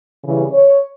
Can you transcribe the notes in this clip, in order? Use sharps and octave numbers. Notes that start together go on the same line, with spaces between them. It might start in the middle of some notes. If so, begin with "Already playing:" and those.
C#3 E3 G3
C#5